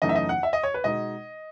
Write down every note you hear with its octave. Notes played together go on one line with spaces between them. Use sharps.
F#2 C#3 E3 A3 D#4 D#5
E5
D#5
F#5
E5
D#5
C#5
B4
B2 G#3 D#4 D#5